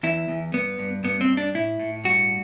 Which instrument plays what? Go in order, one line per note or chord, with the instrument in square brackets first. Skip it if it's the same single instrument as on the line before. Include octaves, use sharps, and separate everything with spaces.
[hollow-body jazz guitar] E2 E4
E2
G2 B3
G2
G2 B3
C4
G2
D4
A2 E4
A2
G2 F#4